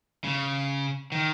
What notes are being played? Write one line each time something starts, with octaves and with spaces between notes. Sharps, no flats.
C#3
D#3